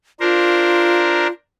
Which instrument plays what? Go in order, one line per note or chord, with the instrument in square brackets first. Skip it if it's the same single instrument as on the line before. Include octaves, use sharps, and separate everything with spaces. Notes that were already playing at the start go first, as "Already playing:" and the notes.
[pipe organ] D4 A#4 C5 [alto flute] F4